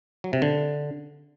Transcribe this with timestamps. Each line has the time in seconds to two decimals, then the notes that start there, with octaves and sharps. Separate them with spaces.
0.24 F#3
0.33 C3
0.42 D3